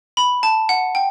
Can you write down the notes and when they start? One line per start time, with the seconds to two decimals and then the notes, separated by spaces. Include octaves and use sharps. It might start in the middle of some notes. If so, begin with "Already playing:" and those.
0.17 B5
0.43 A5
0.69 F#5
0.95 G5